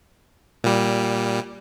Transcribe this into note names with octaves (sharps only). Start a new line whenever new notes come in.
A#2 G3